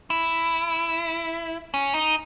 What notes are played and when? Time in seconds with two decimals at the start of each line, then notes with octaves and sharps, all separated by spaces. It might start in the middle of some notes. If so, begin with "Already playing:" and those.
0.10 E4
1.74 C#4
1.94 D#4